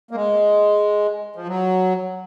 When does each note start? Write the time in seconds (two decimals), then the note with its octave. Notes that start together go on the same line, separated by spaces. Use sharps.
0.11 A#3
0.15 G#3
1.36 F3
1.47 F#3